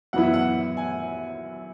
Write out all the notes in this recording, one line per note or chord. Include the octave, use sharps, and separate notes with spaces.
F#2 E3 B3 E4 F#5
E5
F#5
G#5